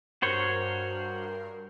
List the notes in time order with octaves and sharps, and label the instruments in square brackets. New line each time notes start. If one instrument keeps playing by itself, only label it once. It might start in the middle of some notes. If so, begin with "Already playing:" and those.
[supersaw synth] G2 A#4 C7 [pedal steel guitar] F#4 C5 C#5